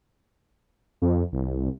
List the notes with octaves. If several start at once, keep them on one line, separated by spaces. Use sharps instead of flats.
F2
C2